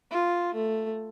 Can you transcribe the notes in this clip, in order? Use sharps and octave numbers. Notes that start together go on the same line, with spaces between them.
F4
A3